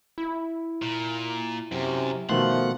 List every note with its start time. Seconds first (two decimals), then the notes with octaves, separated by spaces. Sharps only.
0.18 E4
0.82 A#2
1.72 F#2 C3
2.29 B2 D#3 F3 A3 F#5 C6